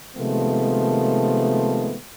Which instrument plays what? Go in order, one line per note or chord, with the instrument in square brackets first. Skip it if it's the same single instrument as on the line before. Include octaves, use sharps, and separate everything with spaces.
[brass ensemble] C3 D#3 F3 G#3 A3 B3